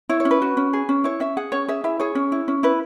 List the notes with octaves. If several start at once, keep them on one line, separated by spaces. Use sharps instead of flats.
E4 C#5
C#5
C#4
B4
F#4
C#4
G#4
C#4
E4 C#5
C#4 E5
G#4 F#5
C#4 C#5
G#4 E5
E4 E5
G#4 C#5
C#4
E4
C#4
E4 B4